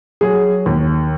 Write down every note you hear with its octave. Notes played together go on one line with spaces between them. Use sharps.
F#3 G#4
D#2